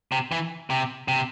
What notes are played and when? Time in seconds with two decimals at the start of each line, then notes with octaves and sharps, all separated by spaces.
0.12 C3
0.32 E3
0.70 C3
1.08 C3